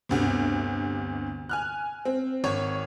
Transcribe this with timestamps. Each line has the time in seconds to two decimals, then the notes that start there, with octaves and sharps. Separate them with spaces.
0.09 G1 D2 C3
1.49 G#5 F6 F#6
2.05 C4
2.44 G#1 C#5